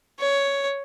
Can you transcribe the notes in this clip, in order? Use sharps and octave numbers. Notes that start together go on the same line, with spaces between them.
C#5